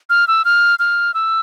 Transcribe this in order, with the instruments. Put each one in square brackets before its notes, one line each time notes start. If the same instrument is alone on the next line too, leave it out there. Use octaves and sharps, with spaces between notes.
[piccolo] F6
E6
F6
F6
E6